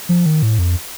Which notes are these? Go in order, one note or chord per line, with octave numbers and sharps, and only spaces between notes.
F3
D#3
A2
F2